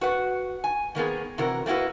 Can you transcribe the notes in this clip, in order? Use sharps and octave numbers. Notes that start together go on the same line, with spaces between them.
F#4 B4 F#5
G#5
D#3 A#3 B3 G#4
C3 E3 F#4 A#4
A3 A#3 E4 F#4 B4